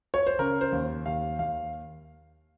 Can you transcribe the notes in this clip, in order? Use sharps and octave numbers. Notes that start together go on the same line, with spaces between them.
C#5
C5
C#3 A#4
C5
D#2
D#2 F5
D#2 F5